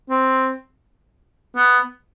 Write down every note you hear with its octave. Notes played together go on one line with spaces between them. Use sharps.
C4
B3